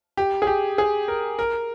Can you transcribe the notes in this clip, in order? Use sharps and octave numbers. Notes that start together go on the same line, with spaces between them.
G4
G#4
G4
G#4
A#4
A#4